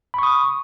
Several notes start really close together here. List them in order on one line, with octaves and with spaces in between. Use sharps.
B5 C#6 D#6